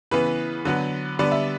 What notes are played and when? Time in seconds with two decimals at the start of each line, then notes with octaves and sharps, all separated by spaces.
0.11 C#3 E3 B3 B4
0.65 D3 F#3 B3
1.19 D3 G3 B3 D5
1.31 E5